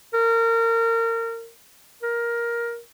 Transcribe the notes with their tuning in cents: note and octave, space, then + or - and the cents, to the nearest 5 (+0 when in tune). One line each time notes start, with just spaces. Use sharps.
A#4 -25
A#4 +15